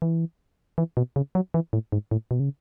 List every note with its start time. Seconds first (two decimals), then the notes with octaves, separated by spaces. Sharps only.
0.02 E3
0.78 E3
0.97 B2
1.16 C#3
1.35 F#3
1.54 E3
1.73 A2
1.92 G#2
2.11 A2
2.31 B2
2.40 C#3